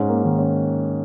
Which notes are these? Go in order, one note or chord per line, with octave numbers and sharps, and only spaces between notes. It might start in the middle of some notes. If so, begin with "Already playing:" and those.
Already playing: G#2 C#4
A#3
D#3
C#4